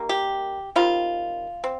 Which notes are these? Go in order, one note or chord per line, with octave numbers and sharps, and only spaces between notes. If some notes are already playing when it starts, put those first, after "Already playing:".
Already playing: D#3 G3 A#3
G4
D#3 G3 C4 F4
C4